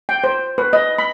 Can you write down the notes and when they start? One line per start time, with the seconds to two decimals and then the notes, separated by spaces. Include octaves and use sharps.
0.09 G5
0.24 C5
0.58 B4
0.73 D#5
0.98 B5